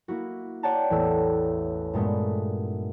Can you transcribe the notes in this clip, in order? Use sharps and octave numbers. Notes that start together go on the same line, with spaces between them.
A#3 E4 F#4
C#5 D5 F#5 G5 A5 A#5
A1 E2 A3 E6
G2 A#2 G#3 A3 B3